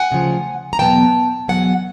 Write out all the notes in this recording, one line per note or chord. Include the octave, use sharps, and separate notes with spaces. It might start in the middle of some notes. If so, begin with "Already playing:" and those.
Already playing: F#5 G#5
D2 C#3 F3
A#5
E2 B2 F#3 B3 G5 A5
E2 B2 F#3 B3 F#5 G#5